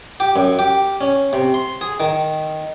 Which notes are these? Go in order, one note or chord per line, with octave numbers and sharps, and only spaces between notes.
G4
F#2
G4
C#4
C3
C6
G#4
D#3